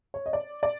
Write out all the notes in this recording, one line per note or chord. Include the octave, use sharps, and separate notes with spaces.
C#5
D#5
D5
D5